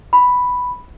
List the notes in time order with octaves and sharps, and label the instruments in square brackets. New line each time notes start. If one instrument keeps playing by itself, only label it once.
[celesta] B5